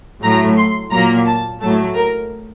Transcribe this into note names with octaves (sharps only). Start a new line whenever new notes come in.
A2 F#3 A3 A#5
C6
A#2 F#3 A#3 A#5
A5
A2 F#3 A3 A5
A#4